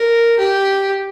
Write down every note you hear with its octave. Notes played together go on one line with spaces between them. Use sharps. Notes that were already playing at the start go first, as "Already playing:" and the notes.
Already playing: A#4
G4